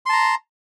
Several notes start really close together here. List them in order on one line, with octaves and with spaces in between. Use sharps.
C6 A5 A#5